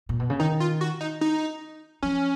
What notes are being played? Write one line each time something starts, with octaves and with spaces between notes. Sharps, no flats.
A#2
B2
C#3
D#3 D#4
F4
F#4
D#4
D#4
F3 C#4